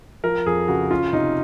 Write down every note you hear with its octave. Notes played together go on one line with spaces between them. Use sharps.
F3 A#4
F2 G#4
C#3 F#4
C#4 F4
C3 D#4